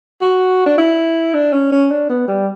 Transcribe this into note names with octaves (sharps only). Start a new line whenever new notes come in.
F#4
D4
E4
D4
C#4
C#4
D4
B3
G3